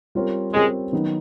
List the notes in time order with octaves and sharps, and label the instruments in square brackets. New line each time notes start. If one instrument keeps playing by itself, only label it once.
[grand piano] G3 C4 F4 A#4 C#5
[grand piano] G3 C4 F4 A#4 C#5 [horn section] G#3
[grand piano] D#3 F#3 B3 D#4 F#4